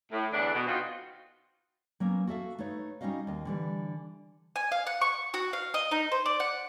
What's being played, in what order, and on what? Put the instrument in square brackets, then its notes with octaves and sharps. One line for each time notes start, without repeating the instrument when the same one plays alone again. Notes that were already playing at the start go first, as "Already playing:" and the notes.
[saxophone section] A2
E2 D3 E3 D4
B2
B3 C4 D#4 F4 F#4
[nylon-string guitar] F#3 A#3 B3 C#4
F#4 A4 E5 F5
A3 D#4 B4 C#5
G3 C#4 D#4 F#4 D#5 F5
D#2 D#5
D3 E3 G3
[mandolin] G#5
F5
F#5
C#6
F#4
F5
D#5
D#4
C5
D5
F#5